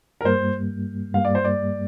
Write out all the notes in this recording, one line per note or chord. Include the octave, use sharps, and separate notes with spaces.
A#4
G2 G3 A#3 C5
G2 G3 A#3 F5
D5
C5
D5